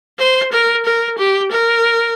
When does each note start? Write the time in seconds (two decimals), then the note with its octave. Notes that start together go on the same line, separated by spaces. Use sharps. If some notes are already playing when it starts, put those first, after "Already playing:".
0.18 C5
0.52 A#4
0.85 A#4
1.18 G4
1.51 A#4